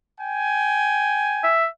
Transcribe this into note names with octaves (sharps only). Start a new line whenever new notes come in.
G5 G#5
E5